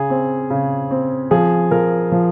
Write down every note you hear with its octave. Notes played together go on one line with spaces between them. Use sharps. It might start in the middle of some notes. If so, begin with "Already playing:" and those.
Already playing: C#3 G#4
C4
C#3
C4
F3 G#4
F3 A#4
F3